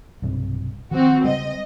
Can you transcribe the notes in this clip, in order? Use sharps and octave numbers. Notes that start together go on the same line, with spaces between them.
B1 G2 C3
D#3 F3 C4 F#4
C#3 G3 G#3 D#5